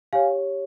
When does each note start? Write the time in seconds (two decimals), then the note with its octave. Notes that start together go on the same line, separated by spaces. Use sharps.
0.13 G4 C#5 F5 G#5